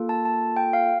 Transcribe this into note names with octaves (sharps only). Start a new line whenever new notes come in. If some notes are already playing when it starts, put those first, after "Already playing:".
Already playing: A#3 F4 A4
A5
A5
G5
F5